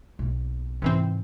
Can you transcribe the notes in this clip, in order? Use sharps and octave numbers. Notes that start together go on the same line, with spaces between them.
B1 A#3
G#2 C3 E3 C4